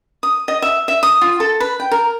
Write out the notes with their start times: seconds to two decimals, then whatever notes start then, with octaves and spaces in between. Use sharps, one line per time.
0.23 D#6
0.48 D#5
0.62 E5
0.88 E5
1.03 D#6
1.21 F4
1.40 A4
1.60 B4
1.80 G5
1.92 A#4